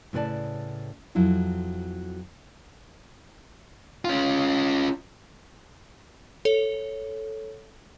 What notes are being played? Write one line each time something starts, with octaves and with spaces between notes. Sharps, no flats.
A2 C#3 B4 C5 D5 A5
F2 F#3 E4 F4
C#4 F4
A4 C#5